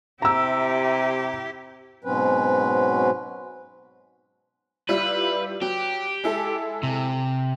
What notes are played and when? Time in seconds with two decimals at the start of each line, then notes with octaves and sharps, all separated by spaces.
0.22 C3 E4 G4 A#5 E6
2.04 G#2 B2 F#3 C4 C#4 B4
4.89 G3 E4 F4 B4
5.62 F#3 G4
6.24 G#3 E4 A4
6.83 C3